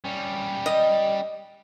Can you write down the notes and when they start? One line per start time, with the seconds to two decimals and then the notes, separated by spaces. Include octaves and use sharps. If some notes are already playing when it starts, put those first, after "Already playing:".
0.04 G3 C#4
0.66 D#5